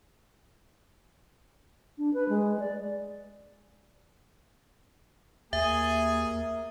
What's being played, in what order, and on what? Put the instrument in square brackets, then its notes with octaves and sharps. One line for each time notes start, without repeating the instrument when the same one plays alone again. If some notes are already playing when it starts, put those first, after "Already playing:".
[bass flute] D4
B4
G#3
D5
[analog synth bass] D#2 [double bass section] A#3 [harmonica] G#4 G#5 [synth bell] E5